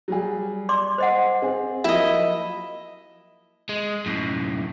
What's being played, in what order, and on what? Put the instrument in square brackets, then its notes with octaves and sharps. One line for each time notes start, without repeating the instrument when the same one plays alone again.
[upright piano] F#3 G3 G#4
[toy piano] D5 C6 D6
C5 D#5 F#5
[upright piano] C4 G#4
[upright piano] F3 F#3 A#3 [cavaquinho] E4 D#5
[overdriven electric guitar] G#3
F#2 A2